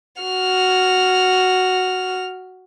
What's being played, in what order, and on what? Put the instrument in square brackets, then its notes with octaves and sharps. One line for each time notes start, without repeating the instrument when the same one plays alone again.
[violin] F#4 F6